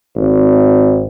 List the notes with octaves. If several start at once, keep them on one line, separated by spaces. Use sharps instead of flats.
G#1